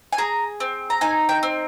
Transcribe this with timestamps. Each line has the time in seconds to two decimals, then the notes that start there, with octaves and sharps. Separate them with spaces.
0.13 G#5
0.18 G#4 A#5
0.60 C4
0.90 A#5
1.01 D#4 G#5
1.29 G5
1.43 C4